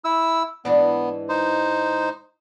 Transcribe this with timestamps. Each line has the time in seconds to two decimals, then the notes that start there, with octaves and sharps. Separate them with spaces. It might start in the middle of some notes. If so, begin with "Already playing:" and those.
0.05 E4 E6
0.65 G#2 E3 B3 D4
1.29 D#4 C5